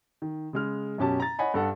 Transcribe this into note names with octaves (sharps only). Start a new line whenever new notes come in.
D#3
C#3 G#3 F6
F#2 B2 C#4 G4 A5
A#5 A6
C#5 D#5 F#5 G#5 B5
G2 A4 F#5